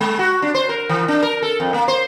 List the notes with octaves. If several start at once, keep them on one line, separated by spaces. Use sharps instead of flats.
G#3
F#4
D4
C5
A#4
E3
D4
A#4
A4
F2
A#3
C5